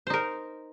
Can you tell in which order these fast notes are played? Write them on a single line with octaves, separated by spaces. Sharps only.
C5 D#4 A#4